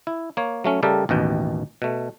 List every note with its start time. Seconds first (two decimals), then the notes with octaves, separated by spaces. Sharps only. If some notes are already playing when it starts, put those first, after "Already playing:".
0.07 E4
0.37 A#3 C#5
0.64 F#3 A3 C#4
0.83 C#3 G3 A3 G4 A4 A#4
1.09 A1 D#2 B2 G5
1.82 B2 A3